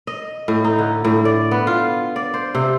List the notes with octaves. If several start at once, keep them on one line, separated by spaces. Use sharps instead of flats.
D#5
A2
D#4
D3
A2
D5
B3
F4
D5
C5
C3